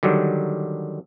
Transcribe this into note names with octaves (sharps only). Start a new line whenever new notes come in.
D3 D#3 F#3 G3